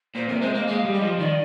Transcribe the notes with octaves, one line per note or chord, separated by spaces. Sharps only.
A#2 C5
C3 A#4
G#3 C5
A#3 D#5
G#3 F5
G3
D#5
F3
D#3 D5